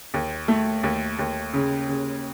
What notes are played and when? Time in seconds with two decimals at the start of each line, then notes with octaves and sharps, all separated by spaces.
0.14 D#2
0.48 A3
0.84 D#2
1.19 D#2
1.53 C#3
1.89 C#3